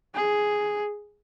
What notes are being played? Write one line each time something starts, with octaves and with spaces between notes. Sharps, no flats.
G#4